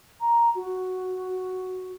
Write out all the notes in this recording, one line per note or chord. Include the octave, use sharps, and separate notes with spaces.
A#5
F#4